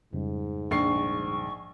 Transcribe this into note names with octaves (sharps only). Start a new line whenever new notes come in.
F2 G#2 C#3 G3
A#1 C#6 C7